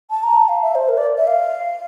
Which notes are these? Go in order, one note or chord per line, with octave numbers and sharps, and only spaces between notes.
A5
A#5
A5
F5
E5
C5
A#4
D5
E5
F5